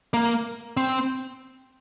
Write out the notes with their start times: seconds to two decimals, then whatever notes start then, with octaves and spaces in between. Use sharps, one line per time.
0.14 A#3
0.77 C4